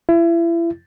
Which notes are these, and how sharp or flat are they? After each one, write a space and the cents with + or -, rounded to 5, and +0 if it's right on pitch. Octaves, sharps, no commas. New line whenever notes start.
E4 +30